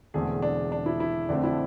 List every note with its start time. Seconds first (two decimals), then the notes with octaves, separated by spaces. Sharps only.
0.14 E1 E2 D3 A3 C4 G#4
0.42 D4
0.72 D4
0.86 E4
1.00 E4
1.29 F2 D3 A3 C4 D4
1.44 E4